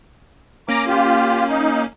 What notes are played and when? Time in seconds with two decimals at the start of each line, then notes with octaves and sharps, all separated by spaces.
0.69 A#3 C#4 A#5 D6
0.88 F4 G4
1.49 D#4